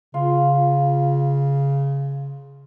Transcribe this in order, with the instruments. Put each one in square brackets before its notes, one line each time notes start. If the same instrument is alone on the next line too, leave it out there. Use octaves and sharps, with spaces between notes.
[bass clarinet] C#3 [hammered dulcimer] F4